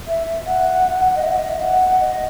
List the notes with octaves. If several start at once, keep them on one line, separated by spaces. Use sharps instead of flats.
E5
F#5
D#5
E5
D#5
E5
F#5
D#5